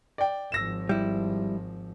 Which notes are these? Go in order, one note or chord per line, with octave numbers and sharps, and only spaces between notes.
D5 G5
G#1 F3 E6 A#6 E7
G3 E4